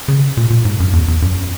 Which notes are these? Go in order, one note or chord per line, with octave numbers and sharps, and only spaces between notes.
C#3
A#2
A#2
G#2
F#2
E2
E2
F#2